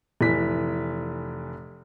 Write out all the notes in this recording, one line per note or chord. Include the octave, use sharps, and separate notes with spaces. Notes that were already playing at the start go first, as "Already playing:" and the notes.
F1 E3 B6